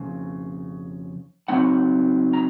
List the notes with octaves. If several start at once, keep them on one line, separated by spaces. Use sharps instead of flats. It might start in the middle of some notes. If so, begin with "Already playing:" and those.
Already playing: F2 C#3
C#3 F#3 C4 D#4 F#5
A#5